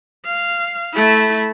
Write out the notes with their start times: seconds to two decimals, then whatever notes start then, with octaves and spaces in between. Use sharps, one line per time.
0.25 F5
0.94 A3 E4